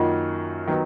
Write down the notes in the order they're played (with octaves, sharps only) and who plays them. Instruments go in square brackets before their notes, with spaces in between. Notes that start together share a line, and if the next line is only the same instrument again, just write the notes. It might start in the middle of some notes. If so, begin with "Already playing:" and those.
Already playing: [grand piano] F#2 D#3 A#3 D#4 F#4 [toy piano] F4
[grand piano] D#3 F#3 B3